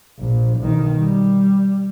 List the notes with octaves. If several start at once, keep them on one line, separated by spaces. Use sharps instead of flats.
A#1
B1 D#3
G3